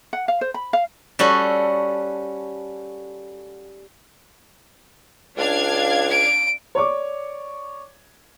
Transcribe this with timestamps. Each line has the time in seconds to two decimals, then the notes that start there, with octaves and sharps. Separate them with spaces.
0.13 F#5
0.28 F5
0.41 C5
0.54 B5
0.73 F5
1.19 G3 C#4 F#4 A4
5.37 C#2 D4 F5 G#6
6.10 D7
6.75 C#5 D5 C#6 D6